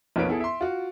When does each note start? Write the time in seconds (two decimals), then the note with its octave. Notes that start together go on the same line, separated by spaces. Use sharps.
0.16 B1 F2 A#3 B4 C#5 D7
0.29 B3 E4 G#4 A4
0.41 E5 C6
0.61 F4 F#4